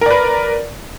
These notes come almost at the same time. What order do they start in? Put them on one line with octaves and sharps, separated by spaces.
A#4 D5 B4